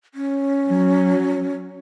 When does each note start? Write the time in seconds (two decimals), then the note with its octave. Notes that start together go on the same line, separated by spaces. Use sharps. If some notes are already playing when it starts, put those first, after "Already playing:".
0.14 C#4
0.67 F#3